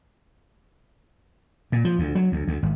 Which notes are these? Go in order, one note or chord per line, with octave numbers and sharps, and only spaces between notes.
A#2
F3
D2
F#3
D2
D2
G#1